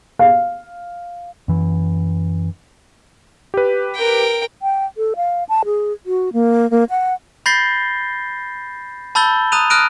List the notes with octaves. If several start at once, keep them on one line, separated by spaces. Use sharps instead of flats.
F5
F#2 E3
G4 B4
A#4 G5
G5
A4
F5
A5
G#4
F#4
A#3
A#3
F#5
B5 G6 A6 A#6 C7 G7
A5 B5 E6 G6 A6 G7
A#5 D#6 F#6 D#7 F7
D#6 F6 F#6 A#6 D7 D#7